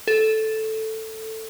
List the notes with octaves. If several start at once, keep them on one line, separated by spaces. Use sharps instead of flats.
A4